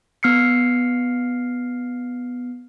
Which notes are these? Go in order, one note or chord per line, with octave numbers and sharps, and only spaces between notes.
B3 F6 C7 C#7